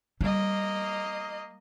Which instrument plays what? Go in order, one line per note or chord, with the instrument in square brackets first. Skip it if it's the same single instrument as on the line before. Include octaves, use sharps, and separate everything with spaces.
[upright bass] G3 [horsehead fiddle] A#3 D#5